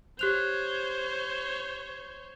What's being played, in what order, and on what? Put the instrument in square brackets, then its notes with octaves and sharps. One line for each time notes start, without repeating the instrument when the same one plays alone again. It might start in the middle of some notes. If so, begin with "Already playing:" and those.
[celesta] G4 F#6 F7 [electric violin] C5 C#5